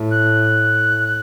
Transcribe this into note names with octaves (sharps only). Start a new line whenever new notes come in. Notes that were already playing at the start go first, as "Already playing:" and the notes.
Already playing: A2
F#6